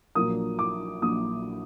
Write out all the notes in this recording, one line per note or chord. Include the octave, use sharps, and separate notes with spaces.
A#1 A#2 F#3 A#3 D4 D#6
D6
A#1 A#2 F#3 A#3 D4 D#6